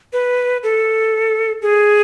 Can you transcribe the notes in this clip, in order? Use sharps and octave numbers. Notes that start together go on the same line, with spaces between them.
B4
A4
G#4